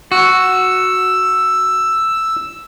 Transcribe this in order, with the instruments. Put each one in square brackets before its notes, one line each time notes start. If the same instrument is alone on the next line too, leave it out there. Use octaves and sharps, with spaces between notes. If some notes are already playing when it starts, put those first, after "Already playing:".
[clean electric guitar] F#4 [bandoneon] E6